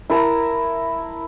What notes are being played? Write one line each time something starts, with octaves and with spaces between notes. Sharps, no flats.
E4 A#4 A5 A#5